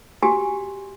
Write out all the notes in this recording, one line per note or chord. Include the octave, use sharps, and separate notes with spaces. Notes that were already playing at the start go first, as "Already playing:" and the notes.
F#4 G4 G#5